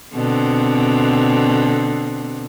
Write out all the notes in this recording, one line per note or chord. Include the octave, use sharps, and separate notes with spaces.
B2 D3 C4